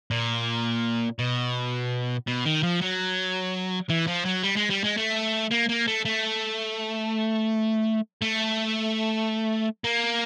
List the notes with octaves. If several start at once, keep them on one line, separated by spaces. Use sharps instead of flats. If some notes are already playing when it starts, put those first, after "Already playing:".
A#2
B2
B2
D#3
F3
F#3
E3
F3
F#3
G3
G#3
G3
G#3
A3
A#3
A#3
A3
A3
A3
A#3